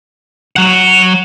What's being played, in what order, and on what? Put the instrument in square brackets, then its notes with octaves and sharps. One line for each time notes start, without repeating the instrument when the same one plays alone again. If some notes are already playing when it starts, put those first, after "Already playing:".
[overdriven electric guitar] F#3 F#5